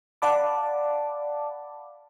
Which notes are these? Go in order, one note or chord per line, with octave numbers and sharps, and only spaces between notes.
D5 F5 F#5 A5 B5 D6